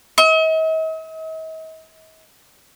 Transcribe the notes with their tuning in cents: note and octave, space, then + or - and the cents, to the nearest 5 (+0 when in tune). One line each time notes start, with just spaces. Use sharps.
D#5 +45